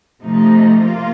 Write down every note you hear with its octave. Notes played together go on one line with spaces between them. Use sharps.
C3 F3 A3 D#4
A#3 F4